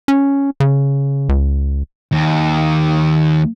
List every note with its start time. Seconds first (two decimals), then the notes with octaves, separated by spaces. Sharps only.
0.08 C#4
0.60 C#3
1.29 C#2
2.12 D#2